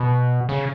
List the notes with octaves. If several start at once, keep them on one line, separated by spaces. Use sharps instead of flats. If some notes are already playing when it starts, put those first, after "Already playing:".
Already playing: B2
C#3